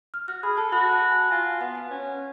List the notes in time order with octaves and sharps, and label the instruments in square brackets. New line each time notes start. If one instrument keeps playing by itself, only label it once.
[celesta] F6
[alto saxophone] F#4 [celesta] F6
[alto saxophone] G#4 [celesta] B5
[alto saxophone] A4 [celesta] A5
[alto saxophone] F#4 [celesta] B5
[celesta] A5
G#5
[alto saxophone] F4 [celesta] G#5
[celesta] F#5
[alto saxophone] B3 [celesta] F#5
[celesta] G#5
[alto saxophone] C#4